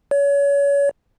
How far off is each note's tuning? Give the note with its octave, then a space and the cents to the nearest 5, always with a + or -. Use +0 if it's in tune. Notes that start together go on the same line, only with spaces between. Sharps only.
C#5 +30